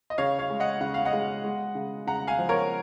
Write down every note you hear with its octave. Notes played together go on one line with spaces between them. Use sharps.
D#5
C#3 C#5 F5
C#5 F5
G#3
D#5 F#5
C#3 F#5
F5
D#5 F#5
G#3
G#3
C#3
C#3 F#5 A#5
F5 G#5
F3
A#4 C#5